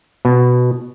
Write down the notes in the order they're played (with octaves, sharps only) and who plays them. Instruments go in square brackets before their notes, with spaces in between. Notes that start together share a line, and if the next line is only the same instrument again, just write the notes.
[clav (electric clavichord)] B2